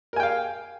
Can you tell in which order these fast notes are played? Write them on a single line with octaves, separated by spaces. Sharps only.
A#4 G#5 G5 F5